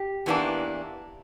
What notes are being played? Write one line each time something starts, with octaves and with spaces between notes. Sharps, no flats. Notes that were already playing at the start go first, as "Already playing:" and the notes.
Already playing: G4
E2 E3 A#3 D4